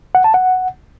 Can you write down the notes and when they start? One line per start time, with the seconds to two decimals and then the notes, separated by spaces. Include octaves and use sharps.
0.15 F#5
0.24 A5
0.34 F#5